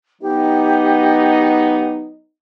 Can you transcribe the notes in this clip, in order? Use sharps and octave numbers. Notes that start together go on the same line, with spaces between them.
F#3 B3 D#4 G4